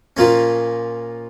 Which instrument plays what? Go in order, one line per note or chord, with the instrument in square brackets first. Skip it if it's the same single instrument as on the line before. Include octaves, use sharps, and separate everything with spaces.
[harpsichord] A#2 F3 A#3 C#4